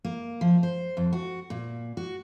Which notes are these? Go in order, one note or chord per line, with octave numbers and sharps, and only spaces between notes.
A#3
F3
C5
F2
F#4
A#2
F#4